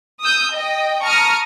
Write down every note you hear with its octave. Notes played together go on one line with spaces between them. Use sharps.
D#6 E6 G6
D#5 G5
A5 A#5 C#6 D#6 F6